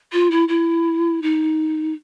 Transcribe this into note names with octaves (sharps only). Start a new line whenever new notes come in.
F4
E4
E4
D#4